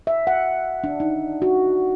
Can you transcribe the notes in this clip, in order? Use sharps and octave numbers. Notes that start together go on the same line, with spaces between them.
E5
F#5
D4
D#4
F#4